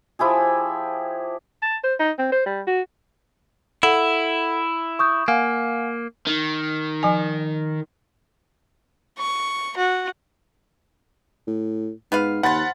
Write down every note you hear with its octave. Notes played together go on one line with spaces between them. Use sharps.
F3 E4 G4 G#4
A5
C5
D#4
C4
C5
G3
F#4
E4 A4 F#5
C#6 D#6 G6
A#3 F5 F#5 G#5
D#3
F3 G#5
C#6
F#4
A2
G#2 B3 B4 F5
D#2 F3 F4 F#5 B5 A6